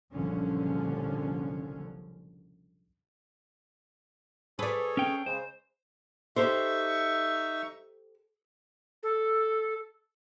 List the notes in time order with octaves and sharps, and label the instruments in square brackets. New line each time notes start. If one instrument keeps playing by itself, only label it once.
[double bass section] F#1 C2 A#2 D3 F3 C#4
[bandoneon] G#4 A4 C#5 [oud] B4 D5
[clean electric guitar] C#4 G5
[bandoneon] C#3 G#3 [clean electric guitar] C5
[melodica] D#4 E5 C#6 [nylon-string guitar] G4 A4 C5
[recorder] A4